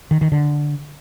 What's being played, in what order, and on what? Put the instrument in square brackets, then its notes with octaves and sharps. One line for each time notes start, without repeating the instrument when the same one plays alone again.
[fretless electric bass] D#3
D#3
D3